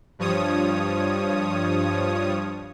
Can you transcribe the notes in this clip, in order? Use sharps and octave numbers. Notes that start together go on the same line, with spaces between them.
G2 F3 C#5 D#6